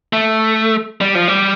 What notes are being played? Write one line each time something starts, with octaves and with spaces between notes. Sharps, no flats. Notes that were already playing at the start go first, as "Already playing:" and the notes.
A3
G3
F3
G3